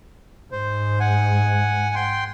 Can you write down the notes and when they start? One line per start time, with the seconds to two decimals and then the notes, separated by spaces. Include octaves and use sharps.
0.52 G#2 C5
1.00 F#5 G#5
1.95 G5 C6